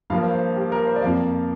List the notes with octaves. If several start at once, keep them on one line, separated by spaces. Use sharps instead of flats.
G2 F3 A#3 F5
C5
C5
G4
A#4
C5
D5
F2 F3 A#3 F5